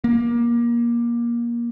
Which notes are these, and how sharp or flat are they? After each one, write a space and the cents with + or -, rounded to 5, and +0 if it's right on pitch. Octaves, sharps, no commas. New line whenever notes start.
A#3 +25